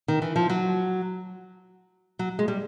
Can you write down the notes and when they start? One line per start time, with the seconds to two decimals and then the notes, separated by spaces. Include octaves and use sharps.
0.08 D#3
0.22 E3
0.36 F3
0.50 F#3
2.19 F#3
2.39 G#3
2.48 G3